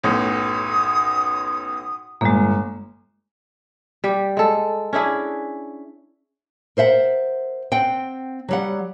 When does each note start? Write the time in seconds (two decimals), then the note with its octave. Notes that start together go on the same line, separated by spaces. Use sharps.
0.04 B1 F#2 A2 D#6
2.21 G1 G#3 A#3
4.04 G3 G4
4.37 G#3 A4
4.93 C#4 D4 E4 G#4
6.77 A#4 C5 E5 F#5
7.72 C4 F#5 G5
8.49 F#3 G3 F#5